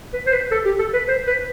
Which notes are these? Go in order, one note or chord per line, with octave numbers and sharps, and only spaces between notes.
B4
C5
B4
A4
G4
A4
B4
C5
B4